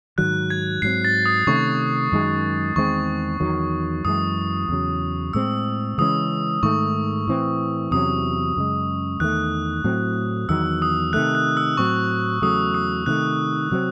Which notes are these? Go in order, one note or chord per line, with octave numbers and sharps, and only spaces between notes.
G#2 D#3 F#3 F#6
G#6
G#2 F#3 C4 C7
A6
D#6
C3 D#3 A3 C#4 C#6
F#2 D#3 G#3
E2 D#3 G#3 C4 C#6
E2 D#3 F#3
F#2 E3 G#3 D#6
E2 C#3 F#3
A2 G#3 C4 E6
C#3 E3 G#3 C#4 D#6
G#2 D#3 A3 C#6
A2 E3 C4
E2 C3 F#3 C#4 D#6
F#2 C#3 G#3
E2 D#3 A3 F#6
A2 F#3 C4
E2 D#3 F#3 E6
D#6
C3 D#3 A3 F#6
F#6
E6
A2 F#3 C4 C#6
E2 C#3 F#3 A3 D#6
D#6
C3 D#3 F#3 A3 F#6
C3 F#3 A3 C4